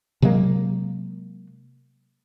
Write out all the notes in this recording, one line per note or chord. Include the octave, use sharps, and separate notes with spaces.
C3 F#3 G#3 A#3